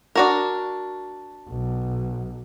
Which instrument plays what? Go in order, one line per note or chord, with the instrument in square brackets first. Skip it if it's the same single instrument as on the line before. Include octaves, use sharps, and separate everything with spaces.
[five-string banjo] D4 F#4 A#4
[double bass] B1